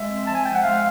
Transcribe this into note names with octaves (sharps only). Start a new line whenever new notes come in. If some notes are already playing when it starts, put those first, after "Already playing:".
Already playing: G#3 E5
C4
F3 A5
G#5
F3 G5
F#5
G#3 F5